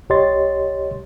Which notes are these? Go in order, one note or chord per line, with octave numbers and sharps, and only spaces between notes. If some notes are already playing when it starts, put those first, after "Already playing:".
C2 G4 C#5 D#5 C6 A6